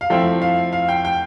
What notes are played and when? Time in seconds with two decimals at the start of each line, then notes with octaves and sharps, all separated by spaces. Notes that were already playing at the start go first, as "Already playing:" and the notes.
0.01 F5
0.10 F3 A3 C4 E4 G5
0.42 F5
0.73 F5
0.89 G5
1.05 G5